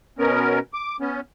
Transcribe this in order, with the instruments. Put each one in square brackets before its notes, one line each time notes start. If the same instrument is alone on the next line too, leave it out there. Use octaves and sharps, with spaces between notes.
[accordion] B2 B3 C#4 A#4
D6
B3 C#4